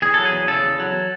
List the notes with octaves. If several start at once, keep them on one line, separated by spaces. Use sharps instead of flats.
E2 G#4
F#3 A4
G#4
E2
C#3 A4
E2
F#3